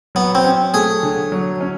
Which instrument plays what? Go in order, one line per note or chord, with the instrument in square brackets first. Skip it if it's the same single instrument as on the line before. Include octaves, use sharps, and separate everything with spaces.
[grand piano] F#3 [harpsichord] B3
[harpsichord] C4
[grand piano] C#4
[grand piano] A3 [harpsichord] G#4
[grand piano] D3
F#3
C#4